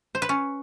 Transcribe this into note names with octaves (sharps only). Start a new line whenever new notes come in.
C5
B4
C#4